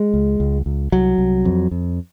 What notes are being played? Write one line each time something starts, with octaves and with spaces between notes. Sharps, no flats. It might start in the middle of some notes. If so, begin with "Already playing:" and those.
Already playing: G#3
C#2
C#2
C#2
C2 F#3
C2
F2
F2